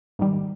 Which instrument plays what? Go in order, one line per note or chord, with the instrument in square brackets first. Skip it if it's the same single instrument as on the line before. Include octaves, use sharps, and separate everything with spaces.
[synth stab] G#2 D#3 G3